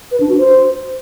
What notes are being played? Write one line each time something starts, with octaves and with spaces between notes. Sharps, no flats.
B4
D4
F#4
C5